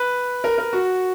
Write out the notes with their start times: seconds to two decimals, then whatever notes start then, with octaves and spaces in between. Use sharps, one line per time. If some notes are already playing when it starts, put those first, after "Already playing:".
Already playing: B4
0.44 A#4
0.58 A#4
0.73 F#4